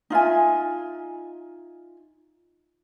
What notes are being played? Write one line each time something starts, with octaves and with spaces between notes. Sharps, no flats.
D#4 F4 E5 G#5